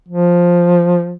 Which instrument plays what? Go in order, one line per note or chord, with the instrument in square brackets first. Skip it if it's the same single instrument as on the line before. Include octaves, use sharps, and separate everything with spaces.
[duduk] F3